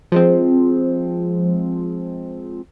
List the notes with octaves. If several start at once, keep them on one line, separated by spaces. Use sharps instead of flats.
F3 G#3 C4